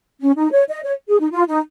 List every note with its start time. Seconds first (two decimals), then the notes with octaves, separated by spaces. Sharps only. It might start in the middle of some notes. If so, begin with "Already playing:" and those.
0.20 C#4
0.37 D#4
0.52 C#5
0.69 D#5
0.84 C#5
1.08 G#4
1.20 D#4
1.31 F4
1.47 D#4